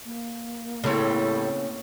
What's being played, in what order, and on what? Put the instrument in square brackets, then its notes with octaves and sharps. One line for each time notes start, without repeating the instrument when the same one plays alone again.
[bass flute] A#3
[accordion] A2 [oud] C#3 C4 [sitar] G3 A4 C#5